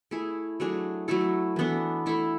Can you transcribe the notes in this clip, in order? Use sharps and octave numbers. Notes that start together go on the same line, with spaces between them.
A3 E4 G#4
F#3 A3 D4 G#4
F#3 A3 E4 A4
E3 B3 D4 A4
A3 E4 A4